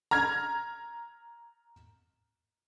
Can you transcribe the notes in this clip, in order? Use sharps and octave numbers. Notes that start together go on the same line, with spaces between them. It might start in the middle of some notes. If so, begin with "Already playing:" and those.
A#5 F6 G#6